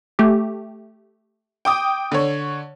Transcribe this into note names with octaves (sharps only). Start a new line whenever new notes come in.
A3 G4
G5 D6 D#6
D3 C#5